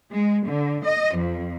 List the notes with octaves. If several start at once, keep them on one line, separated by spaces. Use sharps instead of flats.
G#3
D3
D#5
F2